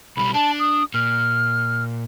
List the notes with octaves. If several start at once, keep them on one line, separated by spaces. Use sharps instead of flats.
B1 G3 B5
D4 A5
D#6
A#2 F6